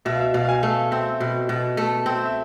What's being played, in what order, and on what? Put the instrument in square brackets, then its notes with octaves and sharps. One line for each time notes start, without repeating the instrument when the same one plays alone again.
[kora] B2 [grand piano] E5
[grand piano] F5
E5
[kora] B2 [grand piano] F5
[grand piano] F5
G#5
[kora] A3 [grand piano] F5
[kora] C4 [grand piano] E5
[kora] B2
B2
A3
C4
[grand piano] E5